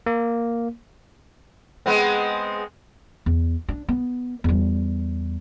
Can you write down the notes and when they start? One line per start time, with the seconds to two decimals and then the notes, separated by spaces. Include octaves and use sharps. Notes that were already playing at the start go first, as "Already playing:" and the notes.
0.06 A#3
1.86 G#3 B3 C4
3.26 E2
3.69 D4
3.88 B3
4.44 E2 G3